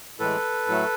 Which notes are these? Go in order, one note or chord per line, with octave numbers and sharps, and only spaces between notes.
A2 E3 G#3 A4 B4
A2 F#3 A3